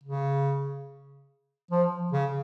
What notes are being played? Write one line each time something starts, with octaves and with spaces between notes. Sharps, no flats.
C#3
F3
C#3